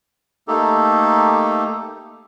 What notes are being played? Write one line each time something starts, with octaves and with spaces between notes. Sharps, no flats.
A3 A#3 D#4 G4 A4